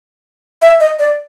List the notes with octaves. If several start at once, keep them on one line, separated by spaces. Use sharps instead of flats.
E5
D#5
D5